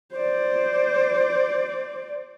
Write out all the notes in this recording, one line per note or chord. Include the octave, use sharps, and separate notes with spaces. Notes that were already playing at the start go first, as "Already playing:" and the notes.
C5 D5